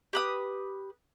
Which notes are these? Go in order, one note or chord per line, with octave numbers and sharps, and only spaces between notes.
G4 B4 D#6